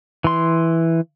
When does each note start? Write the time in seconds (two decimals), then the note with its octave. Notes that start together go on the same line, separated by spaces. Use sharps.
0.24 E3 C6